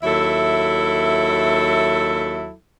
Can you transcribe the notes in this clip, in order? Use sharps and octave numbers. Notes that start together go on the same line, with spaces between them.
D#2 F#3 E4 A4 E5